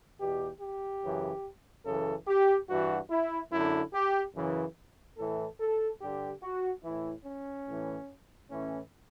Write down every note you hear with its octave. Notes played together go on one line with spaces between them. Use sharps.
E2 B2 G4
G4
F#2 C#3 E3
F#2 C#3 E3 A4
G4
G2 E3 F#4
E4
F#2 D3 E4
G4
F#2 C#3 E3
A2 E3 A4
A4
G2 D3 G4
F#4
A2 E3 E4
C#4
A2 E3
A2 E3 C#4